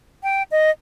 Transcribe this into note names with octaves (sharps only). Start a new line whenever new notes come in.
G5
D#5